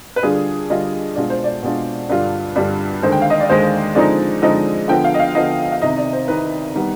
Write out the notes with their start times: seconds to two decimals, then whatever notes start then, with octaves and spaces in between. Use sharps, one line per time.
0.16 B4
0.23 D3 G3 D4 F4 G#4
0.70 D3 G3 D4 F4 D#5
1.16 B2 G#3 D4 F4 D5
1.30 C5
1.44 D5
1.63 B2 G#3 D4 F4
2.09 G2 D3 G3 D4 F4
2.56 G2 D3 G3 D4 F4
3.02 D#2 D3 G#3 C5
3.12 G5
3.22 F5
3.30 D#5
3.40 D5
3.49 D#2 D3 G#3 C5
3.95 D3 F3 G#3 C4 D#4 D5
4.42 D3 F3 G#3 C4 D#4 D#5
4.88 D3 F3 B3 G5
5.04 F5
5.14 D#5
5.19 F5
5.35 D3 F3 B3 D#5
5.72 F5
5.82 C2 C3 D#3 D#5
5.97 D5
6.13 C5
6.28 C2 C3 D#3 B4
6.75 D#3 G3 B3